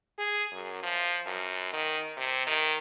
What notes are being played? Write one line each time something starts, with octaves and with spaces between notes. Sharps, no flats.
G#4
F#2
F3
F#2
D#3
C3
D#3